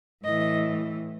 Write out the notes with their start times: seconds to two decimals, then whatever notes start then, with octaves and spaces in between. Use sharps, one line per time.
0.24 A2 E3 D#5